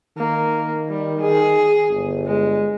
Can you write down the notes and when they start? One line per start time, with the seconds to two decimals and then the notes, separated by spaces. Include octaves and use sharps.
0.17 D#3 A#3
0.90 G3
1.21 G#4
1.90 G1
2.27 G#3